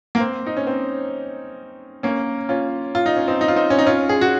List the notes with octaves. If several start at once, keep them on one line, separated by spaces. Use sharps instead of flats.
A#3
C4
D#4
C#4
C4
A#3 C#4
C#4 F4
F4
D#4
C#4
C4 D#4
D#4
F4
C4 D#4
C#4
D#4
C#4 F4
G#4
F#4